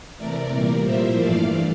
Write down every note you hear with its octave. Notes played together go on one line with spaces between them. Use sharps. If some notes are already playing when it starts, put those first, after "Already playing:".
C3 E3 A3 A#4 D5
A#2 G3 A#3
A2 F3 A#3 C5 E5
G2 E3 A3 D5 F5